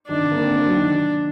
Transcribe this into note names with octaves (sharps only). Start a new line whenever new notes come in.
D#3 D4
D3
A#3
C4
A#3
F#3
D#3